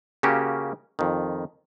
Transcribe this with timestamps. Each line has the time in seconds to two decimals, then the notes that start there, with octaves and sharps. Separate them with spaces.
0.23 C#3 A#3 C#4 F#4 G4
0.99 F2 D#3